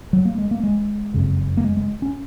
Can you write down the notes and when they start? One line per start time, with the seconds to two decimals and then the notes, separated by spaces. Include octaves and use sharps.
0.13 F#3
0.25 A#3
0.38 G#3
0.51 A#3
0.64 G#3
1.14 F#1 F2 C#3
1.57 A#3
1.64 G#3
1.77 G#3
2.02 C#4